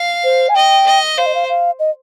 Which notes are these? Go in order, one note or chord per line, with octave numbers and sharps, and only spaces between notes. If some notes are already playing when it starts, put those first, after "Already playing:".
Already playing: F5
C5
G#5
D#5 G5
D#5
C5 F5
D#5
F5
F5
D#5